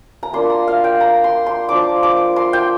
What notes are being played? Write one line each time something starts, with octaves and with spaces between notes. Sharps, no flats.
A#5
A#3 D4 F4 C6
A#5
F5
G5
A#5
C6
C6
F3 D4 F4 D6
D6
C6
G5